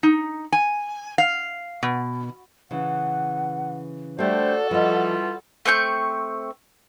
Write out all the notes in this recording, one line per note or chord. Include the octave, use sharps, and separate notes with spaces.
D#4
G#5
F5
B2
C#3 E3 F#5
G3 A3 D4 F#4 G4 A4 C5 D5
E3 F3 G3 F4 D#5 F#5
A3 C4 C#6 G6